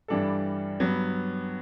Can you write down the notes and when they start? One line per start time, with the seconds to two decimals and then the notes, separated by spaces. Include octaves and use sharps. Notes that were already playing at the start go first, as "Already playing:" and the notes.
0.08 G2 E3 G3 D4 A4
0.80 G2 F#3 B3